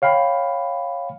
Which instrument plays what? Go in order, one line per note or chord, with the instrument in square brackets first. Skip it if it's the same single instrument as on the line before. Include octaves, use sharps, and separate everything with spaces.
[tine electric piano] C#5 F5 G5 B5